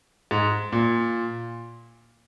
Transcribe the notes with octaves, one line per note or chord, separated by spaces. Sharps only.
G#2
A#2